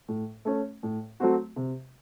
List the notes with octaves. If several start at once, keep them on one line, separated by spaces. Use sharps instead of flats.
A2
A3 C#4
A2
F#3 A3 C4 F#4
C3